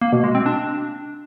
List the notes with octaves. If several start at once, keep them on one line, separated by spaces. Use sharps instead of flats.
A#3
B2
G#3
C4
D4